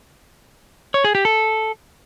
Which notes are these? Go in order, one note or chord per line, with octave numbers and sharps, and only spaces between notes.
C#5
G#4
G4
A4